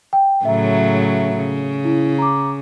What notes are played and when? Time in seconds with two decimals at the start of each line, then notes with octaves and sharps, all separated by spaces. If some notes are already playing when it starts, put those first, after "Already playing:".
0.13 G5
0.45 A2 C#3 F#3 E5 A#5
1.38 C#3
1.85 E4
2.19 A#5 D6